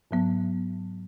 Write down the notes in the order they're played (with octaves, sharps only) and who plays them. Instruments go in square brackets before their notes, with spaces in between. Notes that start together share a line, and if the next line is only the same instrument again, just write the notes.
[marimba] G#2 F#3 B3